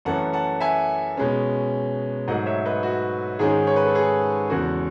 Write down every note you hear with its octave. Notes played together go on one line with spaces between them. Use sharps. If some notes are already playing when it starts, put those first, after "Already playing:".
F#2 E3 A3 C#4 F#5 A5
F#5 A5
E5 G#5
B2 G#3 C#4
G#2 F#3 A3 D#5 F#5
C#5 E5
B4 D#5
F#4
G#2 D#3 G#3 C#4 G#4
C#5
B4
A4
G#4
E2 C#3 G#3 F#4 A4